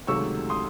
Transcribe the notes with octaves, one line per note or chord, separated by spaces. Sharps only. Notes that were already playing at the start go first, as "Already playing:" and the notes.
C#2 C3 D#3 F#3 A3 C#6 E6
C6 D#6